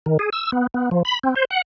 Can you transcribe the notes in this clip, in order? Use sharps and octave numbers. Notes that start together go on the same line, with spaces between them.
D#3
G#4
E6
B3
B3
F3
B5
C4
C5
F#5